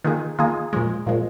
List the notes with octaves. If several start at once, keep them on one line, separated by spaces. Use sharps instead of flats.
D#3 A#3 F4 G#4
D#3 A#3 F4 G#4
A#2 F3 G#3
A#2 F3 G#3